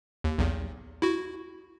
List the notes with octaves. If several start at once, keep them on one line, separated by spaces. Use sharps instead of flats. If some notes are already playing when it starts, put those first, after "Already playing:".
D#2
B1 E2
E4 F#4